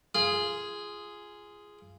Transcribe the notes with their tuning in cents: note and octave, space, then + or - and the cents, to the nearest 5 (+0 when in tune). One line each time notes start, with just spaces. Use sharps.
F4 -15 G#4 +0